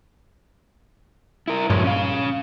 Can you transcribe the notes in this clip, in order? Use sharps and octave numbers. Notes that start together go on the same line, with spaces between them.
E4 A#4
G2 A#2 C#3 F3 G#3 C#5
C#4 F5